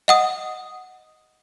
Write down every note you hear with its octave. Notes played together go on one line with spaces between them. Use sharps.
D#5 F#5 D#6